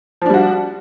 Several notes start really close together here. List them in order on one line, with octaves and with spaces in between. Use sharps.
F3 D4 G3 F#4